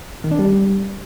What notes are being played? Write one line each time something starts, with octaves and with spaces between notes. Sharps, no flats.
D#3
D4
G3